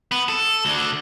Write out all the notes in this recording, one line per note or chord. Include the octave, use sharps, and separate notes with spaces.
B3
A4
D2 D3